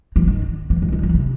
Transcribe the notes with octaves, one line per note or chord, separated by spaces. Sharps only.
E3
D#3
E3
D#3
D#3
E3
C3